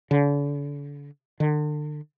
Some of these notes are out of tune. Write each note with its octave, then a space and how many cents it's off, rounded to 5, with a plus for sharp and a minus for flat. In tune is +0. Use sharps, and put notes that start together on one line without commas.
D3 -40
D3 +35